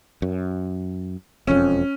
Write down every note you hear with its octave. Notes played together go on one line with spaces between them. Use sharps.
F#2
E1 F2 C#4